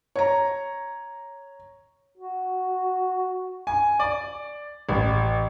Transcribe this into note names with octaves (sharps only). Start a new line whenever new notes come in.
C#5 A#5
F#4
G#5
D5
A1